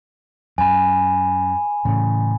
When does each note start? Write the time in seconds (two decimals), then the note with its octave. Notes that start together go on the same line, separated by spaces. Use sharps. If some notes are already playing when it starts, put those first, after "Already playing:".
0.58 F#2 G#5 B5
1.85 A2 C#3 E3